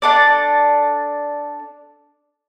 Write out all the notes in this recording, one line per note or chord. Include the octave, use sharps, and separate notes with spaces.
D4 A4 D5